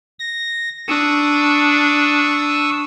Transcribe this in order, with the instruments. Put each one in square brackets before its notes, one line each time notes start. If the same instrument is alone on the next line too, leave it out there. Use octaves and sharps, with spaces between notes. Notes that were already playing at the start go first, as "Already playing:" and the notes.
[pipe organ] A#6
[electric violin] D4 [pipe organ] C#6 D#6 E6